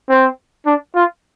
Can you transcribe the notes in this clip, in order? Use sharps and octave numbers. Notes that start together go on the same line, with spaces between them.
C4
D4
F4